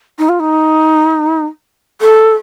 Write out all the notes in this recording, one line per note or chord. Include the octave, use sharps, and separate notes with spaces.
D#4
F4
D#4
A4